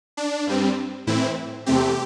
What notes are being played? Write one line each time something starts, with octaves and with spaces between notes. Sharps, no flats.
D4
G2 G3 C4
A2 E3 C4 E4
E2 C3 A3 C4 G4